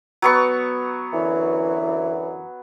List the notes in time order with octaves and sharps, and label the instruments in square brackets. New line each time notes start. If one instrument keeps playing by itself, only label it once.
[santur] F#3 B3 C#6
[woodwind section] F#2 D3 E3